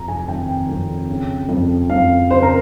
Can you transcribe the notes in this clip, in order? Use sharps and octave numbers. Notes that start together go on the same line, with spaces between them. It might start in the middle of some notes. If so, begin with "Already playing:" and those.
Already playing: F2 C3 A#5
G#5
D#3 G5
F2
C#3
F2
F2 F5
C#3 C5
A#4